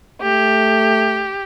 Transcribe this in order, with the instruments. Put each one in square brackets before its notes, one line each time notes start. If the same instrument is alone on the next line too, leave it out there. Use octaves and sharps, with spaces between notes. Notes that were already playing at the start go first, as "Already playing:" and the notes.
[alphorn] A3 [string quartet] G4